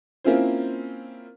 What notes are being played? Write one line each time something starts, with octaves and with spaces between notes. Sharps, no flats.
A#3 C4 C#4 E4 F4 C5